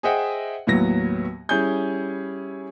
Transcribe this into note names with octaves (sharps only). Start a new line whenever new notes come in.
G#4 C5 D#5 E5 F#5 G5
D#2 A2 F#3 B3 A#6
G3 C#4 E4 G#4 G6